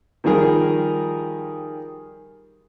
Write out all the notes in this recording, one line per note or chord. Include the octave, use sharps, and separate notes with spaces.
D#3 F3 G3 G#4 A#4